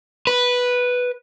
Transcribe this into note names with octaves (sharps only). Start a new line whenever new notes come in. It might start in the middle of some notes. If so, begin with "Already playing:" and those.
B4